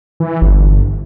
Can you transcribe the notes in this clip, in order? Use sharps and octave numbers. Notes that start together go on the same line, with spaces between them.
E3
G1